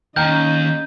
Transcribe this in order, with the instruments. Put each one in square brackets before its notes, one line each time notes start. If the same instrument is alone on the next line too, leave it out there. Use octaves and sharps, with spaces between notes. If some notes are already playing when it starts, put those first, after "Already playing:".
[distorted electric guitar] D#2 [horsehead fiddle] C#4 D#5 [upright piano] G5 A#5 F6 [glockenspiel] G6